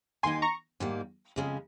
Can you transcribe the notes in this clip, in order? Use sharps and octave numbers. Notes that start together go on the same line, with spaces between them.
D#2 D#3 A#3 D#4 G#5 C6
A#5 C#6
G#2 D#3 G3 A#3
F2 C#3 G#3 C#4